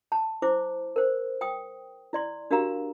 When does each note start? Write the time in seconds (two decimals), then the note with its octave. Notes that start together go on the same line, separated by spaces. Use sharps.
0.12 A5
0.42 E4 C5 D6
0.96 A#4 C5
1.41 G5 D#6
2.13 E4 D5 C6
2.51 D4 F#4 G4 A#4 F5 A#5